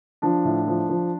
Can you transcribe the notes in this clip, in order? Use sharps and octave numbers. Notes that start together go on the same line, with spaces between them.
F3 D4
A2
F3
F3